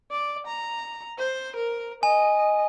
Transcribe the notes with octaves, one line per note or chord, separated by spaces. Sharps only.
D5
A#5
C5
A#4
D#5 G#5